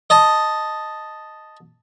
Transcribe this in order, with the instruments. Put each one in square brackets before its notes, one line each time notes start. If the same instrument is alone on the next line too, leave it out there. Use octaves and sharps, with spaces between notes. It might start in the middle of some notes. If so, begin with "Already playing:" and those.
[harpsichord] D#5 A5